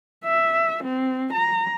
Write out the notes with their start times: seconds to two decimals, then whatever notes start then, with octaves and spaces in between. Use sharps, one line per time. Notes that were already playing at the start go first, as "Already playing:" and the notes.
0.25 E5
0.84 C4
1.33 A#5